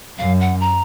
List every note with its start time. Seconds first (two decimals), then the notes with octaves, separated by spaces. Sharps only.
0.18 F#2 F5
0.40 F#5
0.61 A#5